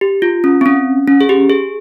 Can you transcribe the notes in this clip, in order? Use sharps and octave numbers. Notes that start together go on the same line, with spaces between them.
G4
F4
C#4
C4
C#4
C#4
G#4
G4
G#4